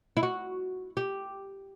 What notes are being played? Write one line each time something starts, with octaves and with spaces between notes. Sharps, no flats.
E4
F#4
G4